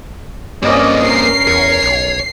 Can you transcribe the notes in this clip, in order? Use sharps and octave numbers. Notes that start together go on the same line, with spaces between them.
G2 A#3 C4 C#4 D5 D#5
C#4 A#4 C7
E2 C#5
B1